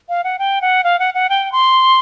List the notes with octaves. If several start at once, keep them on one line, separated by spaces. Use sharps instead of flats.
F5
F#5
G5
F#5
F5
F#5
F#5
G5
C6